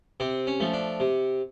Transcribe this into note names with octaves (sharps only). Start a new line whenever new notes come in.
C3 C4
C#4
F3 A3
D4
C3